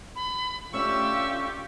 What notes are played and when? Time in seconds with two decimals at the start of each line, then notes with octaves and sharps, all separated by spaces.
0.16 B5
0.74 A3 C#4 D4 F4 G4 C#6 E6